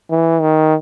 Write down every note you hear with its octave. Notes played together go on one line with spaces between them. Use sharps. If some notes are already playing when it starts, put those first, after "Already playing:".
E3
D#3